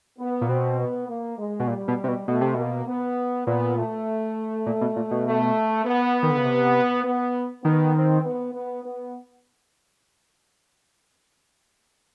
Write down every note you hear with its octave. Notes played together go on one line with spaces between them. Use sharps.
B3
A#2
B2 C4
B3
A#3
G#3
B2
A#2 G3
B2
C3
B2
B2 A3
C3
B2 A#3
B3
A#2 B3
A3
A#2
B2
A#2
B2
A3
B3
D#3
D3
C#3
C3
B3
D#3 B3
C4
B3
B3
B3